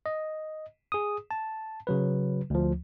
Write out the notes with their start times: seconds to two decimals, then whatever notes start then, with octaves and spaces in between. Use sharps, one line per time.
0.06 D#5
0.92 G#4 D#6
1.31 A5
1.87 C#3 F#3 B4
2.50 D2 F3